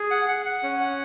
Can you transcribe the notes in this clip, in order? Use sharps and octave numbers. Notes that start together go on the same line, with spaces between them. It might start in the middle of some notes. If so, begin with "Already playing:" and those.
Already playing: G#4
F#5
F#5
F#5
C#4
F#5